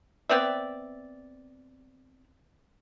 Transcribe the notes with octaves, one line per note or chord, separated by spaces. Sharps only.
B3 C4 D5 E5